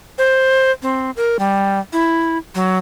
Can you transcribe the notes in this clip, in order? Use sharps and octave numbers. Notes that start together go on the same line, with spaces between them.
C5
C4
A#4
G3
E4
F#3